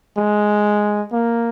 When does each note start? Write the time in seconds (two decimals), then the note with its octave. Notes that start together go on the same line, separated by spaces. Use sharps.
0.18 G#3
1.12 A#3